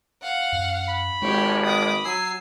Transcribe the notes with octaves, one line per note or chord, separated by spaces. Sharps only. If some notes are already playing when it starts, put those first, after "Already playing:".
F5 F#5
F#2
B5
G#1 G#3 G4 C#5
D6 D#6
F#3 G#5 E6 C7